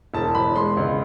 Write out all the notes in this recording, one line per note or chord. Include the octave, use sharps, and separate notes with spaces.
E1 A5
E1 B5
G#3 C6
C#2